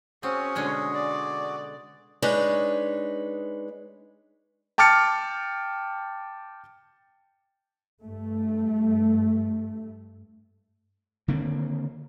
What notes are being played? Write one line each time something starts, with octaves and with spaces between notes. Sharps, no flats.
C4 C#4 F#4 G#4
B2 D3 G#3
D5
G#3 D4 D#4 B4 C#5
G5 A5 D6 F6 A6 C#7
G2 A3
D3 D#3 A#3 C4